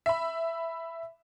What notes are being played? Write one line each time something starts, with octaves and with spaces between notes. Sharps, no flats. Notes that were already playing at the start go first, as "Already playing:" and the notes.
E5 B5